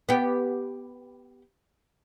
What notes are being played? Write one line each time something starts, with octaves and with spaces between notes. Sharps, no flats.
B3 G4